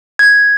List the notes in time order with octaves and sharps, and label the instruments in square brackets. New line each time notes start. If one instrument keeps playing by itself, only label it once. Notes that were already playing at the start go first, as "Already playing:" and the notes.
[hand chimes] G#6